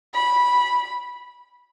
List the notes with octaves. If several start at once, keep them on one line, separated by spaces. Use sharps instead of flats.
B5